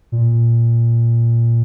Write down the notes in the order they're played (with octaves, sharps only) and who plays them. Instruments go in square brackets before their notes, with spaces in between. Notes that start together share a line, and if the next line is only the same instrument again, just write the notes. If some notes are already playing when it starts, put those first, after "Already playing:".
[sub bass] A#2